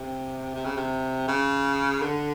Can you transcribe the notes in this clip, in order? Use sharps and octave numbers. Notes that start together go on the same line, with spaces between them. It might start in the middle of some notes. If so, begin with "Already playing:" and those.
Already playing: C3
C3
C#3
C3
C#3
D3